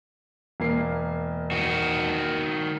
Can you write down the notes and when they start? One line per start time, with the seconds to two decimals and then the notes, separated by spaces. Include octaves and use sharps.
0.60 E1 A#3 C7
1.51 D#3 F#4